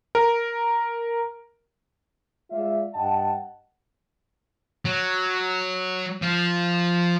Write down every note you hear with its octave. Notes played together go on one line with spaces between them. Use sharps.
A#4
G#3 F4 D5 E5
G2 D#5 F#5 G5 A5
F#3
F3